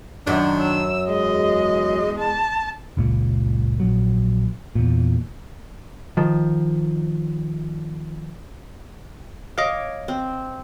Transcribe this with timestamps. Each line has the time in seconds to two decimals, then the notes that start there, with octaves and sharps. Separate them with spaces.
0.27 F#2 D#3 D4
0.62 E6
1.09 E2 G#3 D#5
2.19 A5
2.97 F#1 C#2 A#2
3.80 A#1 F#3
4.75 E2 A#2
6.17 D#3 F3
9.58 C#5 D#5 F5 D6
10.08 C4